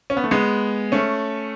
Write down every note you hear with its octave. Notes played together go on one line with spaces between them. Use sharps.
C#4
B3
A3
G#3 B3
A3 C#4